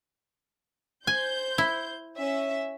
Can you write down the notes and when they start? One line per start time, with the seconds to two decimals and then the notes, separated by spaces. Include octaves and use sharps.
1.07 C5 G#5 G6
1.58 E4
2.16 C#4 E5